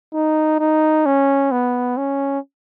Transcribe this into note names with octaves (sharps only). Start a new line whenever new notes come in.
D#4
D#4
C#4
B3
C#4